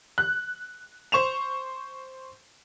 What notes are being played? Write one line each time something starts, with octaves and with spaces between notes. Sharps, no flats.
F#6
C5 C#6 E7 F7